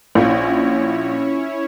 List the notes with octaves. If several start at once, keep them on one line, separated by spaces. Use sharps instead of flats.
A#1 C#4 E4 C#5